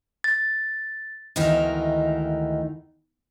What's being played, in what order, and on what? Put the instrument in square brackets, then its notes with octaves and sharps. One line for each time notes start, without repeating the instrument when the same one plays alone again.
[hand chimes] A6
[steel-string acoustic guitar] D2 G#2 D#3 E3 D#4 A#4